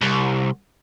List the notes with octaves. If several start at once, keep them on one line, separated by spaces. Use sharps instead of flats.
C2